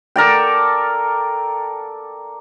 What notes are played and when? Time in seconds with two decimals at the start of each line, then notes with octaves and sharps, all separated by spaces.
0.16 A4 A#4 D5 G5